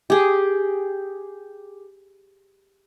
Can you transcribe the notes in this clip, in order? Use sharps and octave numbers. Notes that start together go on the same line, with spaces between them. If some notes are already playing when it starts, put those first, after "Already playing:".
G4 G#4